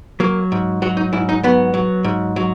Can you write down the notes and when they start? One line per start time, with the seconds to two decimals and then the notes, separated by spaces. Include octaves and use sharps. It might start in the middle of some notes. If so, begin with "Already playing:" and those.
0.20 F#3 A#3
0.52 G#2
0.82 F#3 F#4
0.97 D#4
1.13 G#2 E4
1.29 D#4
1.43 F#3 B3
1.74 F#3
2.04 G#2
2.36 F#3